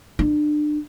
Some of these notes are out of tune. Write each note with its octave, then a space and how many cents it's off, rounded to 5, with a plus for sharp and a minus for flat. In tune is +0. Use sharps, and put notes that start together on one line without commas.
D4 +30